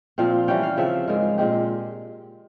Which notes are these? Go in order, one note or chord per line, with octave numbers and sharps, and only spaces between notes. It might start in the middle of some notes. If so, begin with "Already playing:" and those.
A#2 F3 C4 F5
E3 G3 C#4 G5
F5
C#3 F3 C4 E5
G#2 F3 G#3 A#4
A#2 G#3 C4 G4